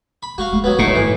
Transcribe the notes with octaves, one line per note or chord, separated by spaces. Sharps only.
B5
G#3 F#4 F5
G#3 A#3
F#3 B3
A#1 A2 A3 D#4 D#5
G2 D#3 E3